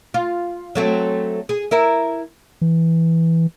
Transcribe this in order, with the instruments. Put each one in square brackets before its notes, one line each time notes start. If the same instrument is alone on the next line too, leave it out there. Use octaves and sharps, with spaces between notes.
[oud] F4
F#3 A3 C4
G#4
E4 A#4 E5
[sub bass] E3